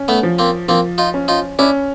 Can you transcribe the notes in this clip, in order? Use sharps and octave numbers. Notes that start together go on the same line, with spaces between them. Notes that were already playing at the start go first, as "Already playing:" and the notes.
Already playing: C#4
A3 B3
F3
A#3 C4
F3 A#3 C4
D#4 F4
C#4
D#4 F4
C#4 D4 E4